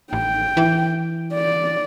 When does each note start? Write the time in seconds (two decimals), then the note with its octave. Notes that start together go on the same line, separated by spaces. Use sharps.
0.13 A1 G5
0.57 E3
1.33 D5